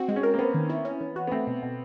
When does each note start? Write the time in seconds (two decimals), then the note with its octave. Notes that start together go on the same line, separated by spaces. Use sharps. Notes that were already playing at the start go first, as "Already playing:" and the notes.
Already playing: C4 F#4
0.08 G#3
0.16 C#4
0.23 A#4
0.34 A#3
0.39 B3 C4
0.54 D#3
0.70 E4
0.85 C#4
1.01 E3
1.16 F#4
1.27 B3
1.32 A3 C4
1.47 B2
1.63 B2